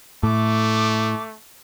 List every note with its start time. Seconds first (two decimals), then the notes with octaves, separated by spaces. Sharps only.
0.23 A2 A3 D6